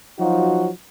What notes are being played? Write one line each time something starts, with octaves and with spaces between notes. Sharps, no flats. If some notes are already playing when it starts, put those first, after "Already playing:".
F3 F#3 D#4 F4 F#4